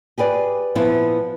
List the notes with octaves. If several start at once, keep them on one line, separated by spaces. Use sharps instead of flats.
G4 G#4 B4 D5
A#2 F3 B3 E4